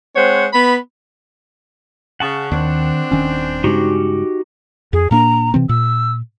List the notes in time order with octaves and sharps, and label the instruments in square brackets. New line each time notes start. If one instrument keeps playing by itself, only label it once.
[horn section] G#3 C4 C5 C#5 F#5
B3 B5
[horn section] C#3 [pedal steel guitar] F#5 A5 C#6
[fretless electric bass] D#2 [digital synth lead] D#3 [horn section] C4 D4
[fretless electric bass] D#1 D#3 [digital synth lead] C#4
[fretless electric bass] G2 C#3 G#3 [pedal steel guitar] D#4 F#4 G4
[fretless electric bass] F2 [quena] G#4
[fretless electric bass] A#2 A#3 D4 [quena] A#5
[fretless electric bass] C3 E3 C4
[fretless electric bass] A#2 [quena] E6